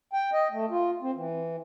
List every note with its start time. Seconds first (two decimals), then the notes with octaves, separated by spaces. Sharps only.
0.13 G5
0.33 D#5
0.52 A3
0.71 F4
1.02 C4
1.16 E3